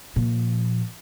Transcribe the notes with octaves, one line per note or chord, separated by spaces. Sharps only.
A#2 F3